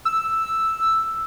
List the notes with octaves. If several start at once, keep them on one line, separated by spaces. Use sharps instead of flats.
E6